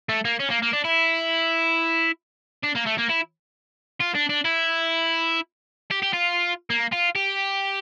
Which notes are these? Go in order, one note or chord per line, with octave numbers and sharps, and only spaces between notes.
A3
A#3
C#4
A#3
A#3
D4
E4
D4
A#3
A3
A#3
E4
F4
D4
D4
E4
G4
G4
F4
A#3
F4
G4